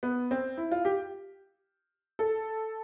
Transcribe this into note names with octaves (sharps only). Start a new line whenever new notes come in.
B3
C4
E4
F4
G4
A4